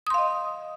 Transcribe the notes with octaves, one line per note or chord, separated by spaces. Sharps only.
D#5 F5 C6 D#6